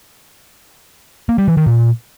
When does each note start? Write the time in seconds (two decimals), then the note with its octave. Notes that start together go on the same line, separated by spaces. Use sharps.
1.29 A#3
1.38 G3
1.48 E3
1.57 D#3
1.66 A#2